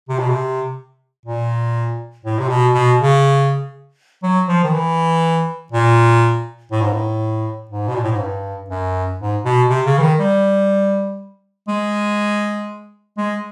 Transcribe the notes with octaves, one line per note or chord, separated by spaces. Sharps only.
C3
B2
C3
A#2
A2
C3
B2
B2
C#3
F#3
F3
D#3
E3
A#2
A2
G#2
A2
G#2
B2
A#2
A2
G#2
G2
F#2
G#2
B2
C3
C#3
E3
D#3
G3
G#3
G#3